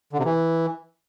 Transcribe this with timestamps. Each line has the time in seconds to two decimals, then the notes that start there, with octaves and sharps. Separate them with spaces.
0.13 D3
0.19 C3
0.25 E3